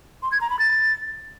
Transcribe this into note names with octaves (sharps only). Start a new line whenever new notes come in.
C6
G#6
A#5
B5
A6